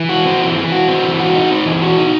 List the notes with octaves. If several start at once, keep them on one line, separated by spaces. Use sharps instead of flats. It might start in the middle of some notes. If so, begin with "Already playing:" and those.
Already playing: E3
F#4
C4
E3
E3
F#4
C4
E3
F#4
D#4
C4
E3
F#4
D#4